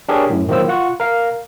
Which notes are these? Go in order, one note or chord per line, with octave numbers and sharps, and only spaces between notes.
D4 G4 G#4 A#4 C#5
F#2 A2
D#3 F3 F#3 A#3 C5 E6
F4 F#5 C#6
A#4 F5